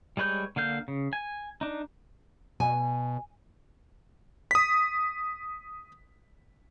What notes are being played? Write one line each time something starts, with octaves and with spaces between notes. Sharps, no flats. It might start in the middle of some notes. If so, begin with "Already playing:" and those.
G3 G#3 B4 C#5 G6
D3 A#3 F5 G6
C#3
G#5
D4 D#4
B2 G#5
D#6 B6